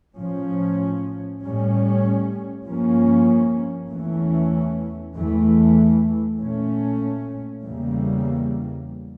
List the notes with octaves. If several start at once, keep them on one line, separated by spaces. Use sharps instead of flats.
A2 F3 C#4
A2 G3 C#4
G2 F3 A#3 C#4
E2 E3 A3 C#4
E2 E3 A3
A#2 A3 C#4
E2 C#3 E3 G3 A#3